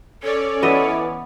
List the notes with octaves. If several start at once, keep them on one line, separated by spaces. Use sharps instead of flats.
C#4 A4 C#5 D5
E3 B3 D#5 E5